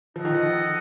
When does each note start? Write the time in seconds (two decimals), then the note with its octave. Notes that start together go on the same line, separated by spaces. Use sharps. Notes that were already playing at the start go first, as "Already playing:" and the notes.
0.16 F3 D#4 A4 D#5 F#5
0.25 D#3
0.34 F3